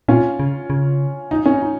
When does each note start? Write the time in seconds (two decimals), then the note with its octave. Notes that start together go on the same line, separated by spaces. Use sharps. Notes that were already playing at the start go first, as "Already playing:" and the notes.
0.08 A#2 C#4 F4
0.40 C#3
0.70 C#3
1.31 D#4
1.46 C#4
1.62 D#4